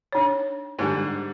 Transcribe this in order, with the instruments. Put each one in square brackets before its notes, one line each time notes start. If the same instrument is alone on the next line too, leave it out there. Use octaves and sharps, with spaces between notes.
[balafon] D4 D#4 C#5
[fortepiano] G#2 D3 G3